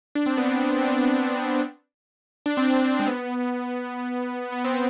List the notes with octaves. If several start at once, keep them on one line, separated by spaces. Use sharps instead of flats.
D4
C4
B3
C4
C4
D4
D4
C4
D4
G#3
B3
B3
C4